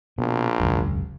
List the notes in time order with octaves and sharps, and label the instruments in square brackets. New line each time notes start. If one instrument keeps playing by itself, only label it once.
[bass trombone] A#1 [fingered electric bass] B2
[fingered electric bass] E1 C#2 F#2